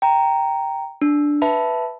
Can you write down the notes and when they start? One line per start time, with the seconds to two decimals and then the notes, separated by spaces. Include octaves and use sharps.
0.02 G5 A#5
1.02 D4
1.42 B4 E5 A5 B5